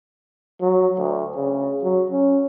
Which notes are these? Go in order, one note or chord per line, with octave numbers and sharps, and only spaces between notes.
F#3
D2
C#3
F#3
C#4